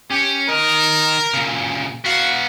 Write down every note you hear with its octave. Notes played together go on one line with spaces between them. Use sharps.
C#4 G4
D#3 A#4 D#5
A#2 C#3
B3 F#4 F5